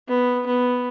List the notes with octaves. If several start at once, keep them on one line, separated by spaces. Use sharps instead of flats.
B3
B3